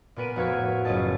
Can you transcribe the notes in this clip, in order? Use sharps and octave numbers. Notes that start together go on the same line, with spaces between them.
A#2 B3 A#4 B4 D7 D#7
F1 F#4 F5 C#6 G#6 B6
A2
F#1 C#4 F4 D#5 A5